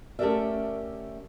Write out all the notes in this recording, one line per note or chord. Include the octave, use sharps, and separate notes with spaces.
A3 C#4 G4 A#4 D5 E5